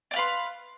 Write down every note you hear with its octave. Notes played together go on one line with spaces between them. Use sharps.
B4 D5 F5 C6